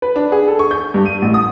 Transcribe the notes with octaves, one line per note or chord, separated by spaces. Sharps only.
B4
D4
G#4
A4
C#6
G6
G2
D#7
A1
D#6